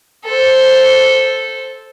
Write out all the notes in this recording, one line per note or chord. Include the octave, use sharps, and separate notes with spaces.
A4 C5